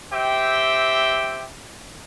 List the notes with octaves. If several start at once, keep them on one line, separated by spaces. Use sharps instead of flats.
C4 G4 E5 G5